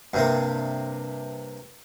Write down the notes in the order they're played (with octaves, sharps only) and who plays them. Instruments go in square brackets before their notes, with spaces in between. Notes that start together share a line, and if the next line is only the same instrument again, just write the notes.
[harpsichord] G2 C3 A#3